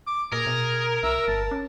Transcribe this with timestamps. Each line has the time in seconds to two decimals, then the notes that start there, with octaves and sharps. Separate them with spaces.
0.07 D6
0.32 A#2 G#4 A#4
0.47 B2
1.03 C2 E5
1.28 G1 A5
1.51 C#4